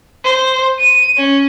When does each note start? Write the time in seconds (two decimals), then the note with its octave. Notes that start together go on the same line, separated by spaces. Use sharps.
0.24 C5
0.79 D#7
1.17 C#4